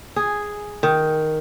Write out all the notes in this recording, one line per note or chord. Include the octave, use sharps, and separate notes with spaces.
G#4
D#3